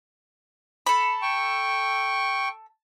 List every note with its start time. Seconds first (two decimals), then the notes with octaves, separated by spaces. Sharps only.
0.87 A4 B5
1.22 G5 C#6